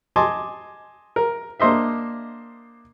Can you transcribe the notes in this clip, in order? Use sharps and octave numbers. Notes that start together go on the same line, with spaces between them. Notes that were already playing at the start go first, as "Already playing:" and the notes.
D#5 G#5 A5 C6 D6
A#4
A#3 D4 C5 D#5 E5